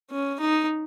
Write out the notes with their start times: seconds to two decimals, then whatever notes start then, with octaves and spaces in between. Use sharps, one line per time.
0.11 C#4
0.40 D#4